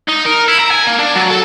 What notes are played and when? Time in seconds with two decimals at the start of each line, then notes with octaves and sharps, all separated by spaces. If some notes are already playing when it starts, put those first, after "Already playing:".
0.08 D#4
0.25 A#4
0.48 E4
0.60 A#5
0.71 G#5
0.88 A#3
0.99 D4
1.16 F#3
1.31 A4